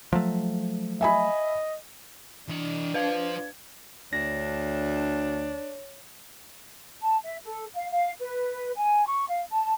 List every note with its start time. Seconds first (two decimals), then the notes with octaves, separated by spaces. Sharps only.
0.13 F3 F#3 A3
1.01 D#5 E5 G#5 B5
2.49 E3 D4 D#5
2.94 F4 B4 C5 F5 G#6
4.13 D2 D4 C#5 A#6
7.01 A5
7.24 E5
7.44 A4
7.74 F5
7.90 F5
8.20 B4
8.77 G#5
9.06 C#6
9.27 F5
9.50 A5